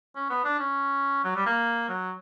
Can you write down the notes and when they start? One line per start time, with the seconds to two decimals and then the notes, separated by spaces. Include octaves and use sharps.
0.16 C#4
0.30 B3
0.44 D4
0.59 C#4
1.24 F#3
1.35 G3
1.46 A#3
1.89 F#3